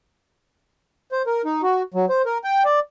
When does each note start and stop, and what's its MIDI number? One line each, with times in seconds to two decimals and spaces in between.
1.12 1.22 72
1.27 1.42 70
1.45 1.62 63
1.63 1.82 66
1.94 2.06 54
2.09 2.22 72
2.26 2.38 70
2.44 2.63 79
2.65 2.79 74